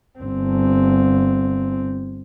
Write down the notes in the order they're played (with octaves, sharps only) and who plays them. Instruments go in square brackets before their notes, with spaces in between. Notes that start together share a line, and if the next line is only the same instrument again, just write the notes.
[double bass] G1 C4